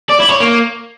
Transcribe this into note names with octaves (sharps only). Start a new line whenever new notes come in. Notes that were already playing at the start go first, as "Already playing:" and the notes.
D5
E4
C#5
A#3